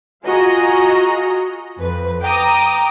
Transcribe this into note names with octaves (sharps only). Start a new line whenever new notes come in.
F4 F#4 G#4 D#5 A#5
F2 B4
G5 A#5 D6 D#6